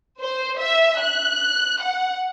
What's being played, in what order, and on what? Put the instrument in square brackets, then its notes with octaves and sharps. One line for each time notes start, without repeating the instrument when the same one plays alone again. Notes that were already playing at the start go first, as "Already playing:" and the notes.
[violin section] C5
E5
F#6
F#5